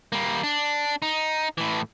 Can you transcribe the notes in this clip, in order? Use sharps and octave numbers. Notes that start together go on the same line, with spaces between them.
G3 A#3
D4
D#4
A2 E3